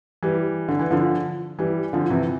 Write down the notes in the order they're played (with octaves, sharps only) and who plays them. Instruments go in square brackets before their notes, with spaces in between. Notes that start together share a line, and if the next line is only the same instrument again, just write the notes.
[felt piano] E3 G3
D3
E3
D3 F3
E3 G3
D3 F3
C3 E3